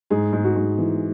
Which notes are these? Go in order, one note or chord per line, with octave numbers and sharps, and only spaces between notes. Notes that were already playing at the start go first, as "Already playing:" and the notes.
G#2 G#4
G#2
F#4
G#2
E3